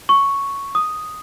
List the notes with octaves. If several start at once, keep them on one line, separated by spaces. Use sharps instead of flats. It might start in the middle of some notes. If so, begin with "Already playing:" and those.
C#6
D#6